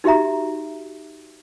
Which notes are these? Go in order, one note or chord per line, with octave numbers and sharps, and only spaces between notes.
D#4 F#4 G4 E5 A#5